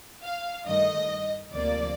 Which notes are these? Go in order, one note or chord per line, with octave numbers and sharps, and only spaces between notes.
F5
G2 D#3 A3 D#5
D2 C3 F3 A#3 D5